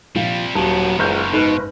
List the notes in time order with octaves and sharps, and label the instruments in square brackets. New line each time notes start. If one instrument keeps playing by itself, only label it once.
[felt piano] A#1 F4 F5 [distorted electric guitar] C3 G3
[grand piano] D#1 [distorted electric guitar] D#3 B3 [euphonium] F#3 [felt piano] A5
[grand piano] F#1 G6 [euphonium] C#2 [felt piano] A#5
[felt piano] G#2 B4 F#6 [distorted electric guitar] B2 [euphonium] D#4